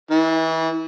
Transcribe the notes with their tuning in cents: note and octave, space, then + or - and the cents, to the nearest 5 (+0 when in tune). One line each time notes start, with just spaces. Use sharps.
E3 -30